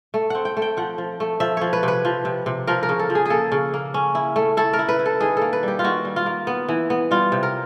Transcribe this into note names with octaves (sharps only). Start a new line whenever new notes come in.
A3
C4 F#5
G5
A3
G5
F3 F#5
F3
A3
F3 E5
F3 C#5
B4
C3 B4
F3
C3
C3
F3 A#4
A#4
C#3
A4
F3
G#4
A#3 G#4 A4
C#3
A#3
C#4
E4
A3
E4 A4
A#4
E4
B4
E4
A4
D#3 G#4
A#3 A4
B4
G3 G4
F4
D#3 F#4
G3
F4
A#3
B3
E3
B3
G3 F4
C3
A#4